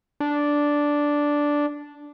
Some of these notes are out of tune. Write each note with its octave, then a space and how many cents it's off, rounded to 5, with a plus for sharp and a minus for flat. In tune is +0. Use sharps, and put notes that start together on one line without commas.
D4 -5